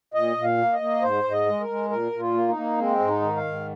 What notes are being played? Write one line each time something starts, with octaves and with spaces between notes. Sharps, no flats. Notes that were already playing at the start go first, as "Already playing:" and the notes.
A#2 D#5
A#2
F5
A#3
D#5
A#3
G#2 C5
G#2
D#5
G#3
A#4
G#3
A#2 A#4
A#2
F4
A#3
D#4
A#3
G#3 C4
G#2
D#4
D#3
F5
G#2